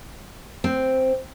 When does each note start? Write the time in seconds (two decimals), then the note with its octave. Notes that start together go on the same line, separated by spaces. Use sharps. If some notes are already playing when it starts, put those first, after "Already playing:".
0.64 C4